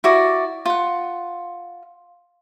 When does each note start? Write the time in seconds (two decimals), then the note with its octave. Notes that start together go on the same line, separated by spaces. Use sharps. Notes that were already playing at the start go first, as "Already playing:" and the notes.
0.04 E4 F#4 D5
0.66 F4 F#5